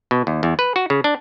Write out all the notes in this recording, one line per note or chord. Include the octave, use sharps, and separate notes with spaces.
B2
D#2
E2
B4
F#4
C#3
D4